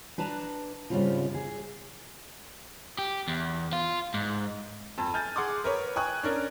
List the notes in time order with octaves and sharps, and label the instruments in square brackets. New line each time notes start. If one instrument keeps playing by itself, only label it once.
[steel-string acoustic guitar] D4 B4 D5 A5 A#5
G#2 C#3 F3 G3 C4 F4
G#4
[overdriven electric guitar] G4
E2
F4
G#2
[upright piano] F2 A5
G#5 F6 G6 A6
G#4 F#5 C6 D6 D#6
A#4 B4 C#5
G5 G#5 C#6 D#6 F#6 G#6
C#4 D4 A#4